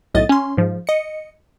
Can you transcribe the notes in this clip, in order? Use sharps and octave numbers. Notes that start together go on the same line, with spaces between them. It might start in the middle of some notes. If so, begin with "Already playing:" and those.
B1 A2 D#5 A6
C#4 C6
G#2 F3
D#5 C#7